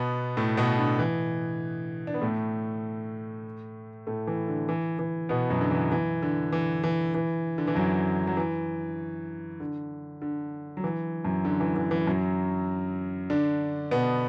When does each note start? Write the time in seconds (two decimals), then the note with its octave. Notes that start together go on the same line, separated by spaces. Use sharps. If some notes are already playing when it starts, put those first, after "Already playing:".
Already playing: B2 B3
0.37 A2 A3
0.57 B2 B3
0.78 D3
0.99 E3
2.07 D4
2.14 B3
2.21 A2 A3
4.07 A2 A3
4.27 E3
4.48 D3
4.69 E3
4.99 E3
5.29 B2 B3
5.50 F#2 F#3
5.61 D3
5.71 E3
5.92 E3
6.22 D3
6.53 E3
6.84 E3
7.14 E3
7.58 D3
7.68 E3
7.75 F#2 F#3
8.27 F#3
8.37 E3
9.60 D3
10.22 D3
10.77 F#3
10.84 E3
11.25 F#2 F#3
11.45 D3
11.60 E3
11.76 E3
11.91 E3
12.07 F#2 F#3
13.30 D3 D4
13.91 B2 B3